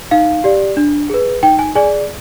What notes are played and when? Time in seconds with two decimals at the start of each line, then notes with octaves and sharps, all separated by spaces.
0.11 D#4 F5
0.44 G4 D5
0.77 D4
1.10 G#4 B4
1.43 D#4 G5
1.59 G#5
1.75 G#4 D5 G#5